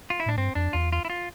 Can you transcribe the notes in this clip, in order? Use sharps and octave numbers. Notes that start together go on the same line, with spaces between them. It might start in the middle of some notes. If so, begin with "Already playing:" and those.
F4
E4
A2 D4
G2 C4
F2 D4
E2 F4
F4
E4
F4